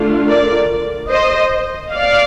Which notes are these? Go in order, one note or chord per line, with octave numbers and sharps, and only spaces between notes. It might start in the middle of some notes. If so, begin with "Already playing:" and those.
Already playing: D3 A3 D4 F4
A#4 D5
C5 D#5
D5 F5